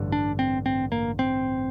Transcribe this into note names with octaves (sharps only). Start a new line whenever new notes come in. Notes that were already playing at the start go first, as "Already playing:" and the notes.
Already playing: A1 G2 D3
D4
C4
C4
A#3
C4